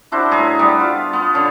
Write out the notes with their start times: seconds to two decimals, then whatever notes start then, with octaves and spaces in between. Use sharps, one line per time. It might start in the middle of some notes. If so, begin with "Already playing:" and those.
0.12 D4 E4 F#4 C5
0.31 A2 G#4 A#5
0.59 G3 B3
0.80 F4
1.13 B3
1.34 D3 C#4